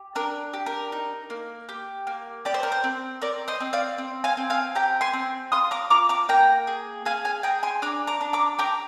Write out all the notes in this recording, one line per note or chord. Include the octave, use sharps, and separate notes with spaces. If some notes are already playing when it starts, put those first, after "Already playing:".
Already playing: G4
D4 A#4
G4
A#4
D#4
A#3
G4
A#3
G4 D5
C5
A#4
C5
C4
C4 A#4 D5
C5 D#5
C4
D5 F5
C4
F5 G#5
C4
F5 G#5
G4 G5 A#5
G#5 C6
C4
F4 C6 D#6
A#5 D6
F4 A#5 D6
A#5 D6
A#3 G5 A#5
G#4
G#4 F5 G#5
F5 G#5
G#4 G5 A#5
G#5 C6
D4 A#5 D6
A#5 D6
D4
A#5 D6
G4 A#5 D6